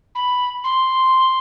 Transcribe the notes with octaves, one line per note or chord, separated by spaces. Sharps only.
B5
C6